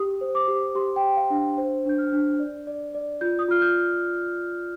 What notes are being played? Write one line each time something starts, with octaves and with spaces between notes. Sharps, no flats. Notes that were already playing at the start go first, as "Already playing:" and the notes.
Already playing: G4 D#6
C5
D6
G4
G4 C6
G5
G4
F5
D4
G5
C5
D4 G6
F6
D4
D5
D5
D5
F4 G6
D#6
F4 F6
G6